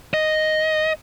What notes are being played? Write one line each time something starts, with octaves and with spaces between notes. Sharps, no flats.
D#5